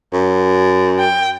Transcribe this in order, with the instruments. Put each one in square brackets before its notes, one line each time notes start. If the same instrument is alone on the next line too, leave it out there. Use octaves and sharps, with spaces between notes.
[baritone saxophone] F#2
[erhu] G5